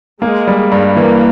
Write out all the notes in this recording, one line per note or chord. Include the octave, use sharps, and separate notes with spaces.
G#3 A#3
G3
G2
E3 A#3